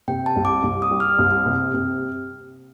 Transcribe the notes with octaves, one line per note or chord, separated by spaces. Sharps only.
C3 G5
A5
C2
D6
C2
D#6
G3
F6
C2
C3
C3